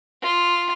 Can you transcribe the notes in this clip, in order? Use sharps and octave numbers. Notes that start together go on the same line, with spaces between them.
F4